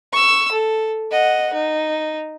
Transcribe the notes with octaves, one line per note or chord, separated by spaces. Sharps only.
C#6 E6
A4
D#5 F#5
D#4